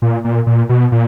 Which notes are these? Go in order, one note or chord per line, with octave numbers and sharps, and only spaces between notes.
A#2
A#2
A#2
B2
A#2